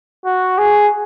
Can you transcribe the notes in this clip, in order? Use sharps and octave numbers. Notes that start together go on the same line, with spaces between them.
F#4
G#4